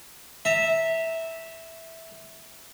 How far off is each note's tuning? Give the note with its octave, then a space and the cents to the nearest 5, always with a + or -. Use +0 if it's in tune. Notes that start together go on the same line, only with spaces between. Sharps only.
E5 -10 A#5 -40